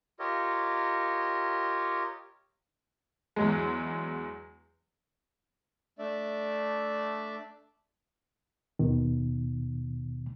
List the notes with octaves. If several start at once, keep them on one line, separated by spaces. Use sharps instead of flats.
F4 G4 A#4 C#5 D#5
E2 F#3 G#3
A3 D4 D5 E5
D#2 B2 D#3